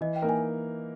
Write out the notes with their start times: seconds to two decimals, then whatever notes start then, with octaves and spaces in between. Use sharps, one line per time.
0.01 E3 D#5
0.16 G5
0.22 A#3 D#4 A#4
0.29 G#5